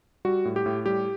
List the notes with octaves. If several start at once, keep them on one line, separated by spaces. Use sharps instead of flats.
G3 F#4
A2
G4
A2
G3 G4